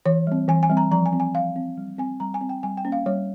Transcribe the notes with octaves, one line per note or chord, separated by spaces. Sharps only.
E3 C#5
G3 C4
E3 G#5
G#5
G3 C4
A#5
F3 A#5
G#5
C4
G#5
F3 F5
C4
G3
C4 G#5
G3 A#5
G#5
C4
G5
G3 G#5
G5
A#3 C#4
F5
G3 C#5